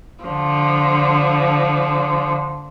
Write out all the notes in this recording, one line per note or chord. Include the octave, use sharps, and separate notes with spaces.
D3 F3